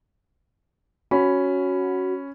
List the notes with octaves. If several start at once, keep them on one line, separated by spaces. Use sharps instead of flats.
C#4 F#4 B5